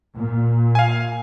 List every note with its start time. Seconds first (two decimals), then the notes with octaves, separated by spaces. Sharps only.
0.16 A#2
0.75 F5 G#5